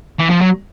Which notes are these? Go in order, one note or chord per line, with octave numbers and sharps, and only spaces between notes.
E3
F3
F#3